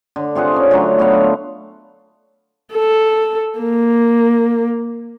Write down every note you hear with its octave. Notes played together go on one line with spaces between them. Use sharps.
D3
C3 F4 G#4 F#5
C#4 D#4
D3 F#3 A3 A#5
F#3 B3 A4 F5
F4
A4
A#3